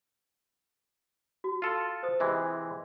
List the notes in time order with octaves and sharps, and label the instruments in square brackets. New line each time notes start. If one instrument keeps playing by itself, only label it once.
[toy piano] F#4
[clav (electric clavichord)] F4 A4
[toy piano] C5 D#6
[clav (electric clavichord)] C3 E3 G#3 [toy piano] F4 E5